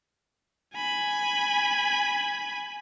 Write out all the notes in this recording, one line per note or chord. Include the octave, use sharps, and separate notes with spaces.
G#5 B5